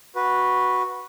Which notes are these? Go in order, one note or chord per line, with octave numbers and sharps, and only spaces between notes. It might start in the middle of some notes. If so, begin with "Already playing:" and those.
F#4 B4